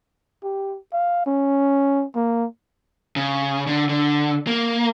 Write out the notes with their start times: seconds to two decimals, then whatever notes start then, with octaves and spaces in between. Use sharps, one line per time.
0.43 G4
0.93 F5
1.26 C#4
2.15 A#3
3.16 C#3
3.67 D3
3.89 D3
4.47 A#3